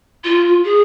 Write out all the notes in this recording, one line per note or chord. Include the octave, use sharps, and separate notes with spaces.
F4
G#4